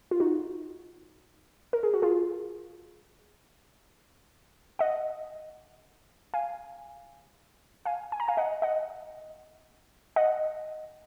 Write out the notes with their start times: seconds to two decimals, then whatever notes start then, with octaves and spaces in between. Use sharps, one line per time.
0.11 F4
0.20 D#4 F#4
1.73 A#4
1.83 G#4
1.94 F#4
2.02 F4 G#4
4.79 D#5 F#5
6.34 F5 G#5
7.85 F5 G#5
8.12 G#5
8.20 A#5
8.28 F5 G#5
8.37 D#5 F#5
8.62 D#5 F#5
10.16 D#5 F#5